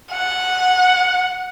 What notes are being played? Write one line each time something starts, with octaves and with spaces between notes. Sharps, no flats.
F#5